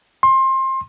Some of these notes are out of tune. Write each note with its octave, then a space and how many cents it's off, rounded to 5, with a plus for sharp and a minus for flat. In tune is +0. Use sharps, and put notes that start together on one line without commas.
C6 +25